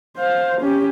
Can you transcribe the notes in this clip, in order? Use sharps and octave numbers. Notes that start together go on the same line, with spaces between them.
C5 F5
C#4 G4